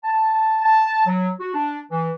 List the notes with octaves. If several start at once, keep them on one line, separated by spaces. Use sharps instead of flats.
A5
A5
F#3
F#4
D4
E3